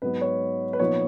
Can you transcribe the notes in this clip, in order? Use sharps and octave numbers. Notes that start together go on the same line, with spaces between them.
G#2 F#3 B3 B4
C#5
B4
A#2 F3 B3 D#4 C#5